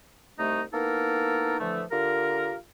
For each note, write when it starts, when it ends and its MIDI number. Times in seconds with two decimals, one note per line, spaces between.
0.39 0.61 36
0.39 0.61 57
0.39 0.61 63
0.72 1.58 58
0.72 1.58 59
0.72 1.58 63
0.72 1.58 64
0.72 1.58 69
0.72 1.58 70
1.59 1.82 50
1.59 1.82 52
1.59 1.82 53
1.59 1.82 57
1.91 2.55 50
1.91 2.55 65
1.91 2.55 67
1.91 2.55 70